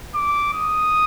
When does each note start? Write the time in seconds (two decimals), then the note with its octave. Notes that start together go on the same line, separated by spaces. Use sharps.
0.15 D6
0.54 D#6